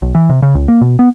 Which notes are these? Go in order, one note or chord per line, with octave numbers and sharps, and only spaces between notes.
B1
E3
C3
C#3
C#2
A#3
B2
B3